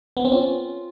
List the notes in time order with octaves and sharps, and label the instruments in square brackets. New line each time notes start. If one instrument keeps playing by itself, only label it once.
[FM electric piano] B3
C4
[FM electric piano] C#4 [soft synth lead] F4